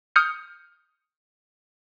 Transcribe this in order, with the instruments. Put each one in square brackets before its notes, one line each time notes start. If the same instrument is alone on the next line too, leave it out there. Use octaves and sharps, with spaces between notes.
[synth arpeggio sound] D#6 F6 G6 C#7